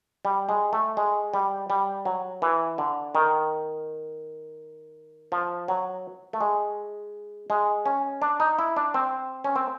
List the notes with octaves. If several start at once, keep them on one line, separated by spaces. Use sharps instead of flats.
G3
G#3
A3
G#3
G3
G3
F#3
E3
D3
D#3
F3
F#3
A3
G#3
G#3
C#4
D4
D#4
E4
D4
C4
C#4
C4